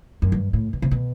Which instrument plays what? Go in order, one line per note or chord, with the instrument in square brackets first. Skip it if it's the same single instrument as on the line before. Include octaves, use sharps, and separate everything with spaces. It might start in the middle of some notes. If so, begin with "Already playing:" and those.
[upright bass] F#2
G2
A2
B2
C3
B2